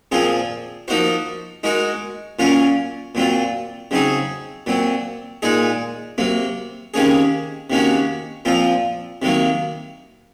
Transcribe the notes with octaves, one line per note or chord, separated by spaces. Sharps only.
A#2 F3 C4 F4 G#4
F3 A#3 D#4 F#4 C5
G#3 D#4 F#4 A#4
A#2 F#3 C#4 F4 A#4
A#2 F#3 C4 F4
C#3 F#3 C4 D#4 G#4
A#2 F#3 C4
A#2 G#3 D#4 G#4
C3 F#3 A#3
C3 D#3 A#3 C#4 G#4
C3 D#3 A#3 C#4 F#4
A#2 F3 C4 F4
C3 D#3 F#3 A#3